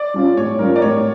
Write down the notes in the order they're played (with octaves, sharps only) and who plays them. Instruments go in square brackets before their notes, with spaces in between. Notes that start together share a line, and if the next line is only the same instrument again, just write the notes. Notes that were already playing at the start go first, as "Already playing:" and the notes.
Already playing: [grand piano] D5
[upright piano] G3 C#4 F4
[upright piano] A2 [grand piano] C#5
[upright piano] G3 C#4 F4 [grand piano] A#4
[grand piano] D5
[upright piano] A2 [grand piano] C#5